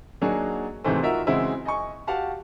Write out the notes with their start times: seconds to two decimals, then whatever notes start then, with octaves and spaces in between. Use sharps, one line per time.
0.21 F#3 A#3 D4 D#4 F#4 G#4
0.84 G#2 C3 E3 A3 C4
1.02 D#4 F4 F#4 A#4 E5
1.27 C#3 E3 G#3 C4 E4 F#4
1.65 D#5 G#5 C#6
2.07 F#4 G4 F5 F#5 A5